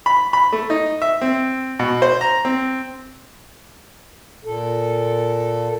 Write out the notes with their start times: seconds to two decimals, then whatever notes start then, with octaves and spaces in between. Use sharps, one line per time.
0.06 B5
0.33 B5
0.53 A3
0.70 D#4
1.02 E5
1.22 C4
1.79 B2
2.02 C5
2.21 A#5
2.45 C4
4.45 A#2 A4